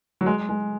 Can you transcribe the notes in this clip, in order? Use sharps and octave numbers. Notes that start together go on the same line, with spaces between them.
F#3
G#3
G#3